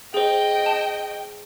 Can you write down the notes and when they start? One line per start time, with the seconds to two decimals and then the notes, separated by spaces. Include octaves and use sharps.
0.14 G#4 C5 D#5 G5
0.66 A5